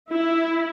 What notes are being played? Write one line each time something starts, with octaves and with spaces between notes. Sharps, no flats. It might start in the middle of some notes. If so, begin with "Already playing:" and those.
E4